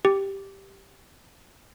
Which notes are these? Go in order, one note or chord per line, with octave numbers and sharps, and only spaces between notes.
G4